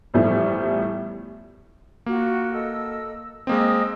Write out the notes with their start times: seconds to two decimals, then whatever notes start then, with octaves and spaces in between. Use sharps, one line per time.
0.14 E2 A2 F3 G3 A3
2.06 A#3 F4 F#4
2.52 A4 D#5 E6
3.47 G#3 A#3 C4 D#5 D#6 E6